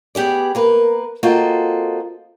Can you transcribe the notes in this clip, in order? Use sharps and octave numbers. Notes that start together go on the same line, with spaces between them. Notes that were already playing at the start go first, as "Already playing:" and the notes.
B3 G4 G#4 D5
A#3 A#4 B4
A#3 C4 F4 F#4 A4 D#5